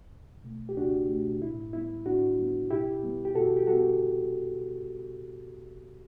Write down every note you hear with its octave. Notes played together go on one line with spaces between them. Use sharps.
C#2
B2 A3
G4
C#2 D4 F#4
B2 A3
A2 E4
G3 B3 E4
A2 D4 F#4
G3 B3
B2 E4 G4
G3 B3
G4
B2 F#4 A4
G4
G3 B3 F#4 A4